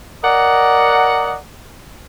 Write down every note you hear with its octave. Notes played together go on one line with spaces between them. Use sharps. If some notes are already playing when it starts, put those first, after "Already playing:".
A#4 D5 D#5 F#5